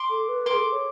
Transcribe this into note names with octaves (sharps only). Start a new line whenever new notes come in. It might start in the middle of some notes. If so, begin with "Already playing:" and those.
Already playing: C6 D6
A4
B4
A#4 C6 D6
G#4
A4
C#5